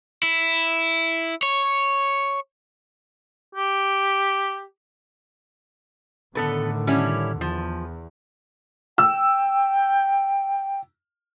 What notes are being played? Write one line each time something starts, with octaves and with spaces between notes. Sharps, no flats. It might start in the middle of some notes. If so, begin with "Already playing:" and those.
E4
C#5
G4
A2 D3 D#3 B3 A4 B4
G3 C#4 E4
E2 F3
G5 E6